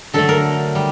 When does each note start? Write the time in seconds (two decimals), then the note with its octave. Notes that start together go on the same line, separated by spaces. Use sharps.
0.14 D3 F#3 A3 A4
0.29 A#4
0.75 G3